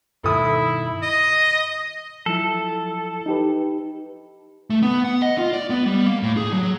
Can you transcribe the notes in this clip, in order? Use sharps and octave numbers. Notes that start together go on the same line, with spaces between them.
G2 B2 D#3 E4 A4 D#6
D#5
F3 F#3 E4 A4
D#4 G4 B4
A3
B3
F#5
D#5
F4
D5
B3
G3
A#3
A2
G#4
F#3